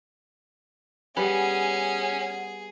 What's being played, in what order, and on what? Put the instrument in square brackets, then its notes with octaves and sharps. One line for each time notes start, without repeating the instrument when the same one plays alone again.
[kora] G3 B3 B4 [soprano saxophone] C#4 [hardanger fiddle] G#4 [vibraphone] F#5